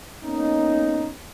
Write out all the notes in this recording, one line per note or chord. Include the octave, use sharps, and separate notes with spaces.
A#3 B3 C#4 D#4